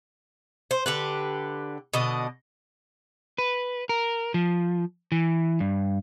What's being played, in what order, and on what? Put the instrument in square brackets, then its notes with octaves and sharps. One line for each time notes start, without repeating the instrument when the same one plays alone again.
[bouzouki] C5
D3 G4 B4
B2 D3 D#5
[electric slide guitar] B4
A#4
F3
E3
G2